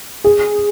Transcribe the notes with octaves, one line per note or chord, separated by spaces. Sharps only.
G#4